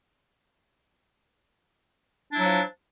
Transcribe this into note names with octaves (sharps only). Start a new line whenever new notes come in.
F3 F#3 D4 E4